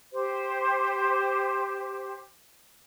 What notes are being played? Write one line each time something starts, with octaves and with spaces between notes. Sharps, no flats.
G4 C5